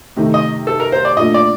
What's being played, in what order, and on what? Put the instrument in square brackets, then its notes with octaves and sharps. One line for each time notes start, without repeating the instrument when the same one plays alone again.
[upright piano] C3 D#3 A3 D#4
[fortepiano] D#5
A4
A#4
C5
D5
[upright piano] A#2 A3 D4 F4 [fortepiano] D#5
[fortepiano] D5